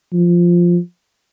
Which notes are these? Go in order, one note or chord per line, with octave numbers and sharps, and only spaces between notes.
F3